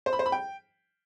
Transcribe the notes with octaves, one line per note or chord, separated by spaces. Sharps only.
C5
B5
C5
B5
G5